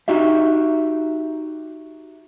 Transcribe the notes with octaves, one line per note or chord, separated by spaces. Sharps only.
D#4 F#4 G4 E5